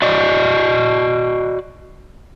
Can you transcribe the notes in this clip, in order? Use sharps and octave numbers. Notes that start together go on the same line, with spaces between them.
F#4 D5 D#5